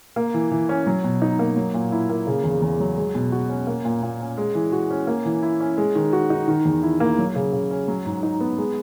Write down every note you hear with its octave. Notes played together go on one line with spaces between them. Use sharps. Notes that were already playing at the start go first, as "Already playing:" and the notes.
A#3
E3
E3
C#4
F#3
B2
D#4
A#3
F#3
A#2
E4
A#3
C#3
E2
E2
F#3
G#3
B2
F#4
C#4
A#3
A#2
A#2
C#4
G#3
E3
F#4
C#4
A#3
E3
E4
C#4
G#3
D#3
F#4
D#4
D#3
E2
E4
A#3
F#3
C#3
C#3
C#4
F#3
G#2
D#4
B3
G#3